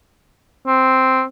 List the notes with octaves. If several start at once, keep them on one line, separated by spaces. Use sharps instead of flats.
C4